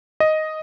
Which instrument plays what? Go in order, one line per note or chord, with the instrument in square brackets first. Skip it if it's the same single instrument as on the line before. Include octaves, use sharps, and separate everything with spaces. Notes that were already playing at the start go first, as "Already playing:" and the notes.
[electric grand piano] D#5